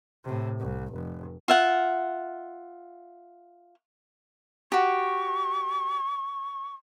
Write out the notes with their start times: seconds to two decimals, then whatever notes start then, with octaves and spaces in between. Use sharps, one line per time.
0.24 A2 C3
0.59 C2
0.93 F1
1.48 F4 E5 F#5
4.72 F#4 G4 C#6